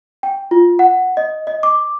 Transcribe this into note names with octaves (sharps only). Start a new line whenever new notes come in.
G5
F4
F#5
D#5
D#5
D6